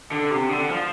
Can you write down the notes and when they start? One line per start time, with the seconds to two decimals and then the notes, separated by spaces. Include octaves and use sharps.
0.11 D3
0.30 C3
0.49 D3
0.69 F3